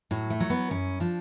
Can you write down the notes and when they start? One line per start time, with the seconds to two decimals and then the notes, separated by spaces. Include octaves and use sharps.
0.11 A2 F#3
0.30 A3
0.40 F#3
0.50 B3
0.70 F#2 C#4
1.00 F3 D4